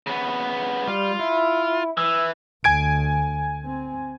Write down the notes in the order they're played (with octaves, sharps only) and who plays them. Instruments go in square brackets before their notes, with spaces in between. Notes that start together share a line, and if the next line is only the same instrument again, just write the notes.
[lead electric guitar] C#3 B3
[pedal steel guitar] G3 [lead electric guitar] F4
[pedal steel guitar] E4
[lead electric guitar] E3 [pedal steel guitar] E6
[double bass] D2 [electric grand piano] G#5 G#6 D7
[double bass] C4